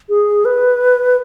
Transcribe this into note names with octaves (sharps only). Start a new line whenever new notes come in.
G#4
B4